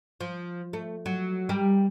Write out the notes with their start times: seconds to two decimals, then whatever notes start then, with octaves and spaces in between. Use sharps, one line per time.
0.21 F3
0.73 A3
1.06 F#3
1.49 G3 G4 A#4